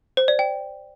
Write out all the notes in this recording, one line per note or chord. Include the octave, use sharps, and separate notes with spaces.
C5
D5
G5